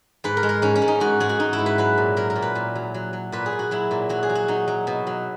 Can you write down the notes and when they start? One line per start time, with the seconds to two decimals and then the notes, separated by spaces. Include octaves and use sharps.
0.24 G#2 B4
0.37 A#4
0.43 G#3
0.49 A#4
0.62 G#2 C#4
0.75 C#4
0.82 G#2
0.88 D#4
1.00 G#2 F#4
1.20 G#2 G#4
1.29 F#4
1.39 G#2 D#4
1.53 E4
1.59 G#2
1.66 B4
1.78 F#3 B4
1.98 A#2
2.17 F#3 A#4
2.30 A#4
2.36 A#2
2.42 B4
2.55 A#2
2.75 F#3
2.94 F#3
3.13 F#3
3.32 A#2 B4
3.46 G#4
3.52 A#2
3.59 F#4
3.71 F#3 E4
3.91 A#2
4.09 F#3 F#4
4.23 G#4
4.29 F#3
4.35 F#4
4.48 F#3 D#4
4.68 F#3
4.87 B2
5.07 F#3